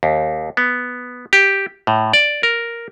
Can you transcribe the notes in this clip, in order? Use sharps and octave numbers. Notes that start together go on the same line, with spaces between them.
D#2
B3
G4
A2
D5
A#4